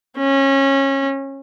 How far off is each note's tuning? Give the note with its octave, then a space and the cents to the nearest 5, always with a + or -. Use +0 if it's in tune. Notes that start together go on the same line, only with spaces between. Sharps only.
C#4 -25